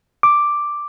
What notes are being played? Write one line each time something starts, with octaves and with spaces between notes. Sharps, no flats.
D6